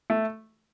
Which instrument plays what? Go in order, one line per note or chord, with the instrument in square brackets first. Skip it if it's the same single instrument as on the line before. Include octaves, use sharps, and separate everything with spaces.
[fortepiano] A3